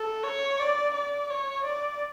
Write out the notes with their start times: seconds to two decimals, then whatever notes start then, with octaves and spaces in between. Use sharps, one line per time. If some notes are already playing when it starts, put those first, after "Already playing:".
Already playing: A4
0.24 C#5
0.60 D5
0.94 D5
1.30 C#5
1.64 D5